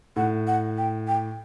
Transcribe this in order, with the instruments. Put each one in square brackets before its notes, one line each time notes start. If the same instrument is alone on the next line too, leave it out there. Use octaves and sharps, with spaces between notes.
[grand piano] A2 [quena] F#5
[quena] F#5
G5
G5